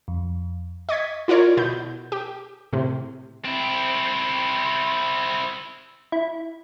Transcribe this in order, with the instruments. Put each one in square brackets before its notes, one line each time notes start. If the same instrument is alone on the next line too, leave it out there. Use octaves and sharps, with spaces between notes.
[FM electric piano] F2
[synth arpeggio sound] D#5 C#6 G#6 B6
E4 F4 A#4 C#5 D5
B2 E4 G6
G4
A2 C3
[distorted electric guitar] C4 E4
[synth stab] E4